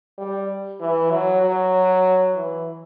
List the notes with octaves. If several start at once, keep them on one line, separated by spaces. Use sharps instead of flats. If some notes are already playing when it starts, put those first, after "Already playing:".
G3
E3
F#3
F#3
E3